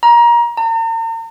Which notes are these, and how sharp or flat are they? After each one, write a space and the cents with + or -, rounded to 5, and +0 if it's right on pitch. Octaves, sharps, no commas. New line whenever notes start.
A#5 +25
A#5 -45